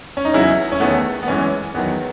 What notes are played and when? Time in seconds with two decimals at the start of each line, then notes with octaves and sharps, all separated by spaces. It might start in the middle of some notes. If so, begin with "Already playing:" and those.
0.17 C#4
0.25 D#4
0.34 E2 C#3 F#3 E4
0.72 C#4
0.80 E2 D#3 A3 B3
1.23 B3
1.28 F#2 E3 G#3 C#4
1.74 E2 D#3 F#3 B3